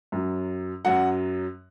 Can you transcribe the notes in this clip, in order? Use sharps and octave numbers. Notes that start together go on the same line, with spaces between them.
F#2 F#3
F#2 F#3 F#5